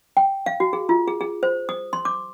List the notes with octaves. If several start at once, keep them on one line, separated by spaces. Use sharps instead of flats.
G5
F5
F#4
G#4
F4
G#4
G#4
C5
D#6
C6
D6